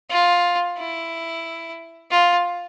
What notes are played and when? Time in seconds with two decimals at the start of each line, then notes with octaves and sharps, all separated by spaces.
0.10 F4
0.78 E4
2.11 F4